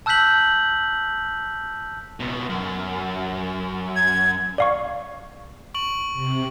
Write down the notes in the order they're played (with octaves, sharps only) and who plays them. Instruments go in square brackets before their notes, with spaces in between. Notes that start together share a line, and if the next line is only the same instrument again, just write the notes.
[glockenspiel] A5 E6 F#6 G6 B6 F#7
[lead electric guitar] C#2 B2
F#2
[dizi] G#6
[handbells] D5 F5 C#6
[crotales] C#6 D7 F#7
[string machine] C3